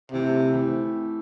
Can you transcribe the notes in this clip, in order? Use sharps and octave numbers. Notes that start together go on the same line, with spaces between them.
C3 E3 A3 E4 G4
E3 A3 E4 G4